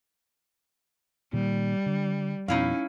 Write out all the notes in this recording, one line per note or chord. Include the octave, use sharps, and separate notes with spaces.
A#2 D#3 G3
D3
F2 B2 C#4 D#4 E4 F5